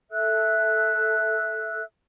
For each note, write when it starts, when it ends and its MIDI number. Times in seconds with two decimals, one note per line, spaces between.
0.11 1.82 69
0.11 1.82 76
0.11 1.82 88
0.11 1.82 90